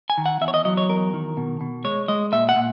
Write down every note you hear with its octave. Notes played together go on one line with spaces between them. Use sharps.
G#5
D#3
F#5
E2 E5
C#5
D#5
F#3 D#5
C#5
E2 A#4
D#3
B2
B2
G#3 C#5
G#3 D#5
A#2 E5
F#5
A#2